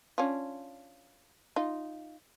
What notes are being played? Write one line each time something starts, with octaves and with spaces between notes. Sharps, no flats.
C#4 D4 F4
D#4 F4